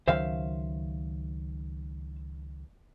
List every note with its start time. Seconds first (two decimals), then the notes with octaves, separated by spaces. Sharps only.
0.08 C#2 D#3 F#3 C5 E5 F5